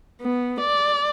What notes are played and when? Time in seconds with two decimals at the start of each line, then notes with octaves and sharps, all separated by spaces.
0.21 B3
0.60 D5